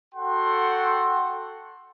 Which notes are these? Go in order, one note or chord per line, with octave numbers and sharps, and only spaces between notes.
F#4 A4 F#5 G5 C6